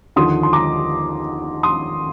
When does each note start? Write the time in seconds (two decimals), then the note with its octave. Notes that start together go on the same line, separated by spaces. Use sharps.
0.16 D#2 D3 F3 C6 D#6
0.43 C6
0.53 A#5 D6
1.63 C6 D#6